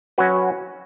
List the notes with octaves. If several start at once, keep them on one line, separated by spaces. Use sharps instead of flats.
F#3 C#4 F#4 B4